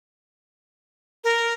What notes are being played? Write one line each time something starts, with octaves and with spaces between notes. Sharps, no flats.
A#4